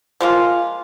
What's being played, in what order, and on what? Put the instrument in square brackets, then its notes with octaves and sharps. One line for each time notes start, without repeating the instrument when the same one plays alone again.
[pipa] F3 G#3 A#3 F4